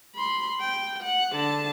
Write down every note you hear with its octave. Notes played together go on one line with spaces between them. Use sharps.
B5 C6
G5
F#5
D3 A5